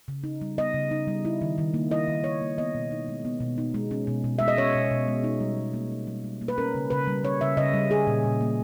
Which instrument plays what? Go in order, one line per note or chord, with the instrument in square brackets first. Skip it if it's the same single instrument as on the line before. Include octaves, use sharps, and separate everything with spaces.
[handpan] C#3
D#4
G3
B3 D#5
C#3
D#4
G3
E4
D#3
D#3
A#3
E4 D#5
D#3
D#3 C#5
A#3
B3 D#5
B2
D#4
G#3
B3
B2
D#4
G#3
C#4
B2
B2
G#3 E5
D#5
C#4 C#5
B2
B2
G#3
D#4
G3
G3
A#3
D#4
G3
G3
A#3
B4
C#4 A#4
C#3
C#3 B4
G3
C#4 C#5
C#3 E5
C#3 D#5
G3
C#4 G#4
A#2
A#2
A#3